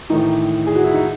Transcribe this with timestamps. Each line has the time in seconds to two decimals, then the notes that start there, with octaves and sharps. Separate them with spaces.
0.10 A2 D#3 E3 D#4
0.66 G#4
0.75 F#4
0.84 E4
0.94 D#4